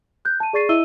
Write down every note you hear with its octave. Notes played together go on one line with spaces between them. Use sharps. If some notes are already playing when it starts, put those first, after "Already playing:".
F#6 G6
A5 D#7
G#4 D5 C#6 A6 C7 D#7
E4 D#5 E5 E6 D#7 G7